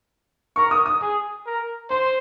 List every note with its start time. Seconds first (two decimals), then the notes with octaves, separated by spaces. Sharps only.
0.56 A#4 C#6
0.71 D#6
0.86 D#6
1.01 G#4
1.46 A#4
1.90 C5 C6